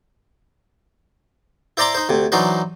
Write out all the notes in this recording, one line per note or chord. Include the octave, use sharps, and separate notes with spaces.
E4 C5 D5 A#5 C6 D6
D#4 C5
D2 C3
E3 F#3 D4 D#4 C5